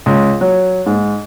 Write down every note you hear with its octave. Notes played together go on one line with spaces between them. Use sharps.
C#2
F#3
G#2